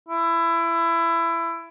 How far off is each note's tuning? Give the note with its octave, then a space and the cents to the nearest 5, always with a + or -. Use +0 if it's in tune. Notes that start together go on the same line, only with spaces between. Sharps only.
E4 +20